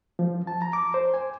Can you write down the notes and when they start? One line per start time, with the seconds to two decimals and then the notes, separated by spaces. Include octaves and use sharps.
0.19 F3
0.47 A5
0.62 A#5
0.73 D6
0.94 C5
1.14 G#5